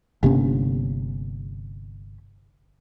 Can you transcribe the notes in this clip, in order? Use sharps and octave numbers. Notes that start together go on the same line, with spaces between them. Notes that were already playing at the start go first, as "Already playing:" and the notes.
G1 C3 A#3 C#4